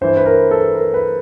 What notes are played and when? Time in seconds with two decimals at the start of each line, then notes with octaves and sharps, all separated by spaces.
0.01 G2 E3 C5
0.17 B4
0.26 A#4
0.51 A4
0.75 A#4
0.94 B4